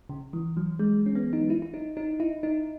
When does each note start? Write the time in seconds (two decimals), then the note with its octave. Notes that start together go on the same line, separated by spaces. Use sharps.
0.09 C#3
0.33 E3
0.57 F#3
0.79 G#3
1.06 C#4
1.15 B3
1.33 D#4
1.50 E4
1.62 E4
1.74 D#4
1.97 D#4
2.20 E4
2.43 D#4